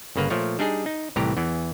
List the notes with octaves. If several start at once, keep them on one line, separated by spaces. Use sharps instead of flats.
G1 C#3 A#3 B4
A#2 F3 A3 C#5
G3 D4 D#4 G#4
D#4
C2 A2 E3 G4 A#5
E2 E3